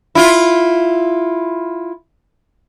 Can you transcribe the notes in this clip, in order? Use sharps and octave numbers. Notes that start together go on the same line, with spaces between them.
E4 F4